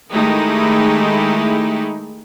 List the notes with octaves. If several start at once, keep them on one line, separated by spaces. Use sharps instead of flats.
D#3 G#3 A3 D#4 E4 G4